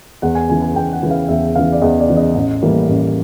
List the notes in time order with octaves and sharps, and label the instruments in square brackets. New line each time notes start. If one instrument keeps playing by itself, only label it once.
[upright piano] E2 F#5
G#5
C#3 E3 G#5
G#5
E2 G5
F#5
C#3 E3
F5
E2 E5
C#3 E3 F5
D5
E2 D#5
D5
C#3 E3
D#5
A1
A2 E3 G3 A#3
A1